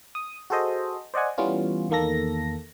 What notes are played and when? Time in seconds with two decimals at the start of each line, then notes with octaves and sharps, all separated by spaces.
0.15 D#6
0.50 F#4 G#4 A4 C5 D#5
1.14 C5 D5 D#5 F#5 G#5
1.38 E3 G3 B3 C#4 F4
1.90 E2 D#3 A#3 A4 A#6